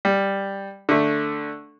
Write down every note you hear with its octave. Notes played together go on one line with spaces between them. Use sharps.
G3
D3 A3